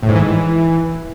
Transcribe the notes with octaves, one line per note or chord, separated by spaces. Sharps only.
A2
G#2
E3
G#2
E3